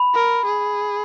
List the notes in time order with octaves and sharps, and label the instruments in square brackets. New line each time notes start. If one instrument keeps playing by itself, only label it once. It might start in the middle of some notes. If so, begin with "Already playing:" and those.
Already playing: [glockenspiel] B5
[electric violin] A#4
G#4